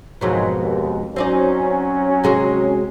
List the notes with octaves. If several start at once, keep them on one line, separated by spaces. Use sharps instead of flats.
F2 G#2 B2 D#3 F#3 G#3
D#2
F#3 C4 C#4 D#4 D5
C3 G#3 F#4